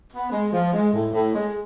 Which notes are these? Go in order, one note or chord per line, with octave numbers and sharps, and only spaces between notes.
B3
G#3
F3
G#3
A2
A2
G#3